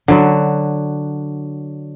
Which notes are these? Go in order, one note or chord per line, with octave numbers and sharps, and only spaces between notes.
D3 F#3